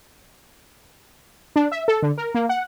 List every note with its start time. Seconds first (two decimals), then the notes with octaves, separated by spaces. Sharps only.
1.56 D4
1.72 E5
1.88 A4
2.02 D3
2.18 A#4
2.35 A#3
2.49 F#5